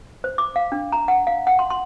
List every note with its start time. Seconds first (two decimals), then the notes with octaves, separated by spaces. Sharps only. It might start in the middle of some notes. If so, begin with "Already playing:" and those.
0.24 C5
0.38 D6
0.56 F5
0.72 D4
0.92 A#5
1.08 F#5
1.27 F5
1.47 F#5
1.59 C6
1.70 C6